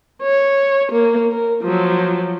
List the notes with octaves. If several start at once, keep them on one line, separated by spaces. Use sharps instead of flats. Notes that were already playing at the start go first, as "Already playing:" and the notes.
C#5
A#3
A#4
F3 F#3